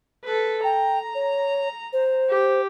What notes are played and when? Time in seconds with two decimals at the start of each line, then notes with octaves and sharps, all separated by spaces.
0.24 A4 B4
0.64 G5 A#5
1.14 C#5
1.92 C5
2.30 G4